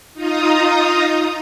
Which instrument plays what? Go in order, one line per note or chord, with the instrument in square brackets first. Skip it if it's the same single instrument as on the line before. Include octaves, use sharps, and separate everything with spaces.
[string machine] D#4 F4 A#5 D#6